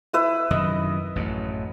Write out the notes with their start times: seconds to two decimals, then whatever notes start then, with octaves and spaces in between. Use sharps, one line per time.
0.13 E4 B4 E5
0.51 F#2 C3 D#3 D#5
1.16 A1 F#2